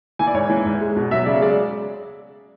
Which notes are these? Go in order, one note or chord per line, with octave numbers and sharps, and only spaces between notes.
E3 G#5
D5
G#2 C#5
E3
G#2
G#3
B2
F#3 E5
C#3 D5
G#3 D5